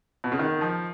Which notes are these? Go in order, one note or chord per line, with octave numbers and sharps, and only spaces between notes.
B2
C#3
D#3
F3